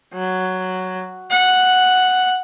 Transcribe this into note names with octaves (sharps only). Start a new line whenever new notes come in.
F#3
F#5